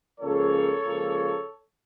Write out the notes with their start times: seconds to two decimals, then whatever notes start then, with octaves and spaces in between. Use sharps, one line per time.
0.20 C#2 C#3 F3 A#3 A4 C#5
0.81 C#2 C#3 F3 A#3